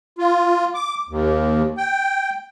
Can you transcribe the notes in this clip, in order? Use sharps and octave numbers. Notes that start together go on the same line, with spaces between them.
F4
D6
D#2
G5